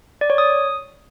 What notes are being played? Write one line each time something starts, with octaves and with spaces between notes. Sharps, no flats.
D5
C#5
D#6